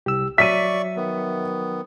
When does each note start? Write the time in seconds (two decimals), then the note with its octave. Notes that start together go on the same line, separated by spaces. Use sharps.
0.06 C2 G4 E6
0.38 F#3 D5 E5 C#6 B6 D#7
0.96 D#3 B3